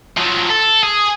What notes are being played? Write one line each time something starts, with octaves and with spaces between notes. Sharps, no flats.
F3 F#3
A4
G#4